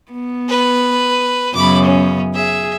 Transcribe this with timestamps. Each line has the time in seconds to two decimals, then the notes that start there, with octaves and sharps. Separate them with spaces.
0.12 B3
0.49 B4
1.55 F#2 C#3 B3 B5 D6
1.84 C#4
2.35 G#4 E5